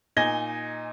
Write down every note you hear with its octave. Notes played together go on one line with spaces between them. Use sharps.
A#2 D#4 G#5 G#6 A#6 G7